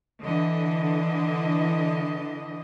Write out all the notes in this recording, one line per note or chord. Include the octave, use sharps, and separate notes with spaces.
D3 E3 D#5